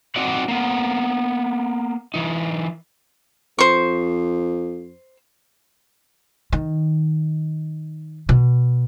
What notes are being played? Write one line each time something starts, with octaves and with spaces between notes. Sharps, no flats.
C4 D#4 F#4 G#4 D5 F#5
A#3 B3
E3 D#4
F2 C5 C#6
D#3
B2